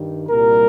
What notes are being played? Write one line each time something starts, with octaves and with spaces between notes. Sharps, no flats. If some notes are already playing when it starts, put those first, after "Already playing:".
Already playing: G2 D#3 G3
C2 A#2 G3 A#4